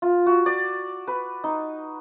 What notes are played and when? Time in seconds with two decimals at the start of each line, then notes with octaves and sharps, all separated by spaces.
0.02 F4
0.26 F#4
0.46 D5
1.07 B4
1.44 D#4